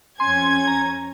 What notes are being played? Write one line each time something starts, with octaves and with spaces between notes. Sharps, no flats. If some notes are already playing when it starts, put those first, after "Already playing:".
F2 C#4 G#5 C6 G#6
A#5